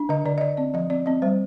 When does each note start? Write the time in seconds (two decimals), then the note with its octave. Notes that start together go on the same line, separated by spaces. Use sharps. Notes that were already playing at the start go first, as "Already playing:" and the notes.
Already playing: D4
0.09 D3 D#5
0.25 D3 D5
0.38 D#5
0.41 D3 D5
0.57 C4 D5
0.74 F3 D#5
0.90 C4 D5
1.06 C4 D#5
1.22 G3 C5